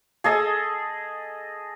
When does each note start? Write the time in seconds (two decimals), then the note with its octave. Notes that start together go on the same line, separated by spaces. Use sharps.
0.24 G#4 A4 D#5